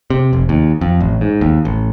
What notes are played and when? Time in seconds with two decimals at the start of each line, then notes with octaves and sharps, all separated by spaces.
0.10 C3
0.33 F1
0.49 D#2
0.81 F2
1.00 A1
1.21 G#2
1.41 D#2
1.65 A1